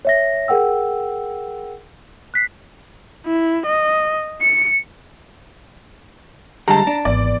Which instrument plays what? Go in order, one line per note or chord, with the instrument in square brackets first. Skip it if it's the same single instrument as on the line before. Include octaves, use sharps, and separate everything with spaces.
[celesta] C#5 E5 A#6
G#4 A#4 F#5 G5 E6
F#6 B6 C7
[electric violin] E4
D#5
C#7
[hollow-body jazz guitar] D3 G3 G#3 [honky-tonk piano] A5 A#5
[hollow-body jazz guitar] D4
[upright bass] G#1 [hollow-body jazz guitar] E2 [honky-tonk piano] D5